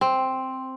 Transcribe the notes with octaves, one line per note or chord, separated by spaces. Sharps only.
C4